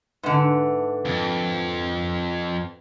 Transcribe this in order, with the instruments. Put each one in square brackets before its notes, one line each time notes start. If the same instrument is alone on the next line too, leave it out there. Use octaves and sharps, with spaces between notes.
[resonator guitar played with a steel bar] G#2 D3 [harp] B4 E5 F#5
[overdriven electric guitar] F2